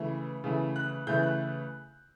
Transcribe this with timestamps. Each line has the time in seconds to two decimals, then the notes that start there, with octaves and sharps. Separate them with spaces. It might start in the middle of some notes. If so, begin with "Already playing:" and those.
Already playing: C#3 E3 A3
0.44 C#3 E3 A3
0.76 F#6
1.07 C#3 E3 A3 G6
1.23 F#6